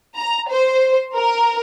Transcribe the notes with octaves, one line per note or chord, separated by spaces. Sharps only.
A#5
C5
A#4